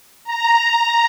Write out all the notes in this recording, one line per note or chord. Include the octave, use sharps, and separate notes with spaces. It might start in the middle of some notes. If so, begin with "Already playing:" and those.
A#5